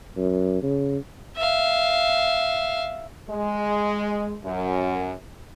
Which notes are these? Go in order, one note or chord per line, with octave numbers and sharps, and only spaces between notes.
F#2
C#3
E5 F5
G#3
F#2